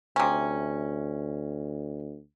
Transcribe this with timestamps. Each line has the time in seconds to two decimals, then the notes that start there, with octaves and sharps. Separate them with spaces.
0.16 D2 C3 C#4